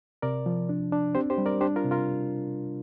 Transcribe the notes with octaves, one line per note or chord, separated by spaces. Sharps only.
C3 A#4 D5
F3
D4
D4
C4 G4 C5
G4 C5
G3
A#4 D5
D4 G4 C5
F4 A#4
C3
F4 A#4